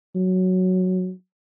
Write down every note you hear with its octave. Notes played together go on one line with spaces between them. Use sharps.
F#3